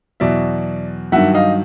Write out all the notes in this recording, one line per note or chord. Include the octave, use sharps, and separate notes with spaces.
E2 B2 F#3 D5 E5
G2 D#3 F#3 E5 F#5
D#5 F5